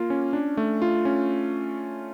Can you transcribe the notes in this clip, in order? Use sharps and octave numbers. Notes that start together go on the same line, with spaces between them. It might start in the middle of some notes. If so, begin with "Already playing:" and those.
Already playing: A#3 F4
C#4
D4
A3
F4
C#4